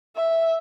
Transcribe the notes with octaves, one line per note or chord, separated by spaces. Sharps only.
E5